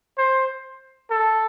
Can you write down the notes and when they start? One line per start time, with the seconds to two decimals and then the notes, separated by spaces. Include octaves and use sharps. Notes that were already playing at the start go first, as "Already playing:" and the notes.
0.18 C5
1.11 A4